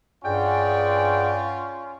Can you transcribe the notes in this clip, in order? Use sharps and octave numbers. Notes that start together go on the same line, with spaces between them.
G2 C#4 F4 G#4 D5 F#5 G5